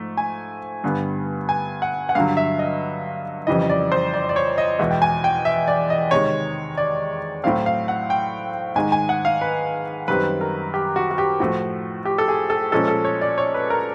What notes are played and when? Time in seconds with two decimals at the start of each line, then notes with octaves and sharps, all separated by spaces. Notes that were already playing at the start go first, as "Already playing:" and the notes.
Already playing: G#2 F3 A3
0.17 G#5
0.84 G2 D3 G3 B3
1.49 G#5
1.82 F#5
2.09 F#5
2.15 G2 D3 F#3 F5
2.37 E5
2.59 D#5
3.47 F2 C#3 E3 G3 D#5
3.70 D5
3.92 C5
4.14 D5
4.29 D5
4.36 C#5
4.58 D#5
4.79 E2 B2 G#3 E5
4.91 G5
5.02 G#5
5.24 G5
5.45 E5
5.68 D5
5.90 D#5
6.11 C3 D#3 G#3 C#5
6.77 D5
7.44 A2 F#3 A3 C4 F5
7.66 F5
7.88 F#5
8.10 G5
8.75 G#2 D#3 G#3 G#5
8.92 G#5
9.09 F#5
9.25 F5
9.41 B4
10.08 F#2 D#3 G3 C4 B4
10.41 A#4
10.74 G4
10.96 F#4
11.11 F#4
11.18 G4
11.40 A2 F3 A3 F#4
12.05 G4
12.18 A4
12.28 G#4
12.50 A4
12.72 A#2 F3 G#3 C#4 A4
12.88 A4
13.05 C#5
13.21 D5
13.38 C#5
13.54 B4
13.70 A#4